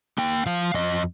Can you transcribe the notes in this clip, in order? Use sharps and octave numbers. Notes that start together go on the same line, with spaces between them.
A#3 G5
F3 F5
F2 D#5